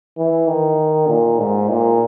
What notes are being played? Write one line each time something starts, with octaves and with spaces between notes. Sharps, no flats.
E3
D#3
A#2
G#2
A#2